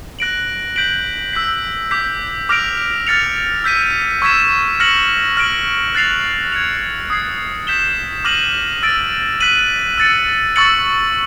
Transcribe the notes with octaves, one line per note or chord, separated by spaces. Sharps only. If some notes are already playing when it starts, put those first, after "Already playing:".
F#6 A#6 D7 F#7
G6 B6 D7 F#7
E6 G6 B6
D6 G6 B6
D6 F6 A#6 D7 F7
F6 A6 C#7 F7
E6 G6 B6 D#7
C#6 E6 G#6 B6 E7
F6 A#6 C#7 F#7
F6 A#6 D7 F#7
F#6 A6 C7 F7
G#6 C#7 F7
D#6 G#6 C7
G6 B6 E7 G7
D6 F6 A#6 D#7 F#7
E6 A6 D7
F#6 B6 D#7 F#7
E6 A6 C#7
C#6 E6 A6 C#7 F#7